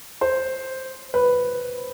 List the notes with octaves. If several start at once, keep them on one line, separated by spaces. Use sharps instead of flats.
C5
B4